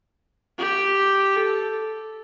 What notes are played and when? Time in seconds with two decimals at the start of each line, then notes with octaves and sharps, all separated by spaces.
0.59 G4
1.36 A4